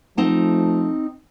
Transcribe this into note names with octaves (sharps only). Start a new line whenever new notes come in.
F3 A3 C4 D#4 A5